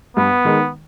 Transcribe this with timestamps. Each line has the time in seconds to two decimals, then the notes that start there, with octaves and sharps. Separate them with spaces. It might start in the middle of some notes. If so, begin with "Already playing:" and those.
0.17 G2 B3
0.45 D#3 G#3 D#4